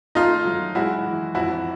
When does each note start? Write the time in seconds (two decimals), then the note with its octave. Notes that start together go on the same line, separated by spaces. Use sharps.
0.15 A3 D#4 F4
0.46 F#3
0.75 G#3 E4 F#4
1.05 E3
1.35 F2 E4 F#4